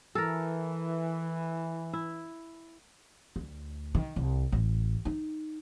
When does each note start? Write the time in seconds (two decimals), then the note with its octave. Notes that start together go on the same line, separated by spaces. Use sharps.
0.15 E3 A4 A#4
1.93 E4
3.36 D2
3.95 D#3
4.16 C2
4.52 A1
5.05 D#4